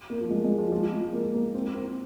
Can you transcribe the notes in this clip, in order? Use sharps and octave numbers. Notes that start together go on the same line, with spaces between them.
A#3
F3
G#3
G#3
F3
F3
G#3
A#3
A#3
C4
C4